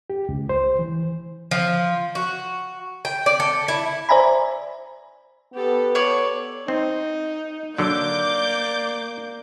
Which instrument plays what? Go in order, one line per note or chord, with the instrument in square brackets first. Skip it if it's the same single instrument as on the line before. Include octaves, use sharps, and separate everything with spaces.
[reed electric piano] G4
C#2
C5
E3
[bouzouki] F3
F#4
G5
D5
A4
E4
[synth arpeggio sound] C5 D5 E5 G#5 A#5 B5
[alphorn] B3 [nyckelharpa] G4 A4
[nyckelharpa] A4 B4 [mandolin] C#5 D5
[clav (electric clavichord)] C4 [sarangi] D#4
[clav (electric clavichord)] D3 F#3 [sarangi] A#3 [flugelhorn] D5 [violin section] D6 G6